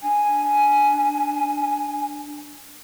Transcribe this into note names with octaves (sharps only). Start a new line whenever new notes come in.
D4 G#5